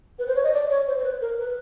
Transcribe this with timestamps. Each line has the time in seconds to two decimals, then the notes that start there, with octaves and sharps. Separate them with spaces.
0.19 B4
0.28 C5
0.36 C#5
0.44 D#5
0.53 D5
0.70 C#5
0.87 C5
0.98 C5
1.04 B4
1.21 A#4
1.39 B4